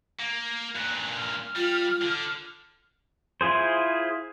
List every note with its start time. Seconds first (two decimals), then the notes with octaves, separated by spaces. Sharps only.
0.20 A#3
0.76 G2 A#2 F#6
1.17 F6
1.56 G3 F4
2.02 D3
3.41 E4 F4 G#4 C5